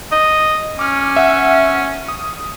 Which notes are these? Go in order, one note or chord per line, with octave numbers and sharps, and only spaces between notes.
D#5
C#4 D6 F6
E5 F#5
D#6